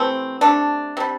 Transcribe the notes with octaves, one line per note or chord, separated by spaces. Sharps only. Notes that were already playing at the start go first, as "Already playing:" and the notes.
Already playing: C3 E3 A3 C4
C3 A3 D4
C3 G3